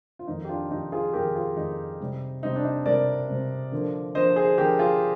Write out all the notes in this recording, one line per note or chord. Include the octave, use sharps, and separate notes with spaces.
F4
F2 D#3 A#3 D#4
G4
D4 F4
F2 D#3 A#3 D#4 G4
F4 G#4
F2 D#3 A#3 G4 A#4
F4 G#4
F2 D#3 A#3 D#4
C3 G3 C4
C3 G3 C4 D#4
D4
D#4
C3 G3 C4 A#4 D5
C3 G3 C4
D3 F3 A#3
D3 F3 A#3 C5 D#5
G#4 C5
D3 F3 A#3 G4 A#4
F4 G#4